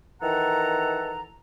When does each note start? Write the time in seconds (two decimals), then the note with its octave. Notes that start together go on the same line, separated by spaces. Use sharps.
0.21 D#3 E3 A4 F#5 A#5